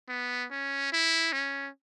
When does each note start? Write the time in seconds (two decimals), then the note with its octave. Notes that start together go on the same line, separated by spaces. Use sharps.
0.09 B3
0.51 C#4
0.92 E4
1.33 C#4